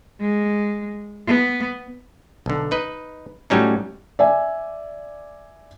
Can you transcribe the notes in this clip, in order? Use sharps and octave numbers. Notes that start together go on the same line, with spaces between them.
G#3
B3
B1 D3
D#4 B4 D#5
A2 F#3 G3 C#4 D#4
D5 E5 G#5